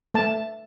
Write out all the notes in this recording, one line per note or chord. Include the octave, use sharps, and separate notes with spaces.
A3 A5